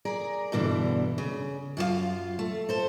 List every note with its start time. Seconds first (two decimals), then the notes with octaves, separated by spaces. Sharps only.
0.05 G#4 A#4 D5
0.52 G2 B2 D3 E3
1.18 C#3
1.77 F#2 F4 F#4 F5
2.39 A3
2.69 A4 C5